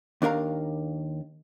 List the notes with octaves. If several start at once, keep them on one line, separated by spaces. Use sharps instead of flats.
D#2 D4 A#4 F5 A#5